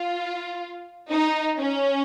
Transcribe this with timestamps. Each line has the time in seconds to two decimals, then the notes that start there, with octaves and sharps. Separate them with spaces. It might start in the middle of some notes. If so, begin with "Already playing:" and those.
Already playing: F4
1.11 D#4
1.58 C#4